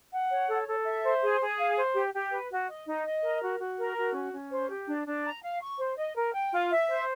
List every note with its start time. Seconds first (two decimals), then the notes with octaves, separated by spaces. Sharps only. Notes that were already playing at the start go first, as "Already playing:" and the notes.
0.13 F#5
0.30 C#5
0.49 A4
0.67 A4
0.84 E5
1.04 C5
1.22 G#4
1.41 G#4
1.59 F5
1.77 C5
1.94 G4
2.13 G4
2.32 B4
2.50 F#4
2.68 D#5
2.86 D#4
3.05 D#5
3.22 A#4
3.42 F#4
3.59 F#4
3.78 A#4
3.97 F#4
4.14 C#4
4.33 C#4
4.50 C5
4.69 G4
4.87 D4
5.06 D4
5.24 A#5
5.43 F5
5.61 C#6
5.78 C5
5.97 D#5
6.15 A#4
6.34 G5
6.52 F4
6.71 E5
6.89 C5